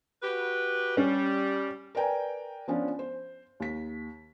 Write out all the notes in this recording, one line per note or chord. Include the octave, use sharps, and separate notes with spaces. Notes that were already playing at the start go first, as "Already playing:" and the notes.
F#4 G4 B4
G3 C#4
A#4 B4 D5 G5 G#5 A#5
F3 B3 C#4 D4 F4
C5
D#2 B6